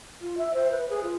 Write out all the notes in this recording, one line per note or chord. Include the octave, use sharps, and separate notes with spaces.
F4
E5
C5
B4
G#4
F4